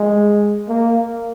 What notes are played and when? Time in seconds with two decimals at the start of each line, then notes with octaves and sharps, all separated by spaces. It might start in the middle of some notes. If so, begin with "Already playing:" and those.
Already playing: G#3
0.68 A#3